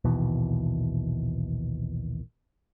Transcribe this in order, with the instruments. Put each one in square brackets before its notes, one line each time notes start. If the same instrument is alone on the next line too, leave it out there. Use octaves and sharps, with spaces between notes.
[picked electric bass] A#1 D#2 B2 E3